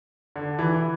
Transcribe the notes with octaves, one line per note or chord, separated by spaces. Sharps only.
D3
E3